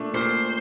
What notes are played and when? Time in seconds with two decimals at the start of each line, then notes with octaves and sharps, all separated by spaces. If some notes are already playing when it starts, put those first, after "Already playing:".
Already playing: A#2 A3 D4
0.14 A#2 C5